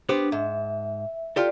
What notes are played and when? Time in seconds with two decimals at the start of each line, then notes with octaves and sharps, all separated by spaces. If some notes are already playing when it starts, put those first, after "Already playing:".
0.09 B3 D4 G4 C5
0.32 G#2 E5
1.36 F4 G4 A4 D5